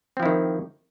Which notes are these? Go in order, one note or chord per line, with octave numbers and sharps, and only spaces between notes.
D#3 F3 C4 E4